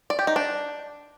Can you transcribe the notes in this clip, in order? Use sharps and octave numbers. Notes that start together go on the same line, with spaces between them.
D5
G4
D#4
D4